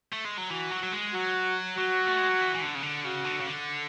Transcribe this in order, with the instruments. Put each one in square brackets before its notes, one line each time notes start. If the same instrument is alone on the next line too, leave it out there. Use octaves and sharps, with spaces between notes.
[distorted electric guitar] A3
G#3
F#3
[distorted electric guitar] E3 [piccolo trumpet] F#4
[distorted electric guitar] F#3
F#3
G#3
[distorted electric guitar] F#3 [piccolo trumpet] F#4
[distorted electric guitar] F#3 [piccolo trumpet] F#4
[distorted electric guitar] A3
G#3
F#3
E3
E3
D3
C#3
D3
[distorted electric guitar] C#3 [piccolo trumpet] F#4
[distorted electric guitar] D3
C#3
D3